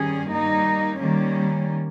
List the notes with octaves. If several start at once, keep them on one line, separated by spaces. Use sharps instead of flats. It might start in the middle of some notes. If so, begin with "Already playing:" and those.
Already playing: G2 D#3 G3 C#4 G#4
G3 A#3 D#4
D#3 G3 A#3 C#4